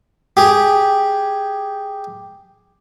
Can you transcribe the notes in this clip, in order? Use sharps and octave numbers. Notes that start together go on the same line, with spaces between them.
G4 G#4